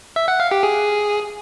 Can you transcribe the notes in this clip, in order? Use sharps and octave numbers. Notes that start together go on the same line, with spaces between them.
E5
F#5
F5
G4
G#4